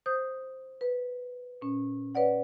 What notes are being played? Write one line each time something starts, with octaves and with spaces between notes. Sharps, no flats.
C5 D#6 G6
B4
A#2 C#4
B4 C#5 D5 F#5